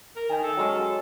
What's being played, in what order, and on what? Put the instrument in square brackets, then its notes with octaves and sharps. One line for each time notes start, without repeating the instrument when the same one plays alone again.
[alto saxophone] A#4
[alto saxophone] D#3 [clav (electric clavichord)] G5 G#5
[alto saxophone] A4
[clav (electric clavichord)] F#3 G#3 C#4